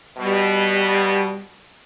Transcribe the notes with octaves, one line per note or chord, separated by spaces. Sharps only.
B2 G3